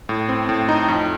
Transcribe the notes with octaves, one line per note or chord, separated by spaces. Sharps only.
A2
C4
A2
D#4
F2